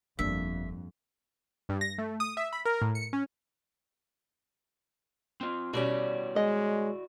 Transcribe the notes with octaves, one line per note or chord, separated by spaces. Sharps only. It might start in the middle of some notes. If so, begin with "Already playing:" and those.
G1 F2 G3 A#3 D4 E5
G2
A#6
A3
D#6
E5
B5
A#4
A2
C#7
C#4
C4 F4
B2 G3 C#4 E4 F#4 D5
G#3 D#5